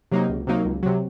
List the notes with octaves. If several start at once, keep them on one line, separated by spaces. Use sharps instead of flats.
C3 F#3 A#3 D#4
C#2
C3 F#3 A#3 D#4
C#2
C3 F#3